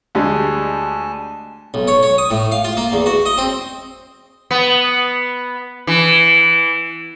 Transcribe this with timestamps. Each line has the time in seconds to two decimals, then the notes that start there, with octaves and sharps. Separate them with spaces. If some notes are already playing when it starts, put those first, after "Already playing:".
0.15 D2 G3 G#3 G#5 A5
1.74 B1
1.88 C#5
2.03 C#5
2.18 D#6
2.31 A2
2.52 F5
2.65 F4
2.77 A#3
2.93 E2
3.06 F#4
3.26 D#5
3.38 C4
4.51 B3
5.87 E3